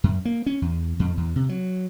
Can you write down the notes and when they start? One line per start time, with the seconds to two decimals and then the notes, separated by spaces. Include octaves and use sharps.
0.04 F#2
0.25 A#3
0.46 C#4
0.62 E2
1.00 F2
1.17 E2
1.36 C3
1.49 F#3